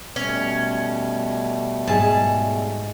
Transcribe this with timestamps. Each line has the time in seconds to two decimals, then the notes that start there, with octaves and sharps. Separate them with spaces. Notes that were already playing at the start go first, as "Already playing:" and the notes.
0.16 B2 G3 A3 C#4
1.87 G#2 G#4 A5